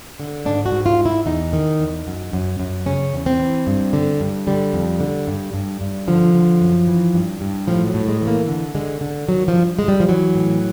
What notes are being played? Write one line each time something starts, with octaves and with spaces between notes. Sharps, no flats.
D3
G#2 D4
F#4
G#2
F4
G#2
E4
E2 D#4
D#3
E2
F#2
F#2
F#2
C#3 C#4
E2
C4
E3
G2
D3
G2
D3 G3
F2
D3
G2
G2
G2
D3 F3
D3
F#2
E3
G2
G2
A2 F3
F#3
A2
G#3
E3
A#3
D3
D3 G#3
D3
D#3 F#3
F3
G2
G2 G#3
G3
F3
E3 F#3
A2